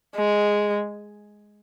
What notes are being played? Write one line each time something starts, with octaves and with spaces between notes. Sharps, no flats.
G#3